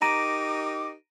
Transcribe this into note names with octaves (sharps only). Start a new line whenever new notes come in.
D#4 G4 A#4 A#5 D6 A#6 D7 D#7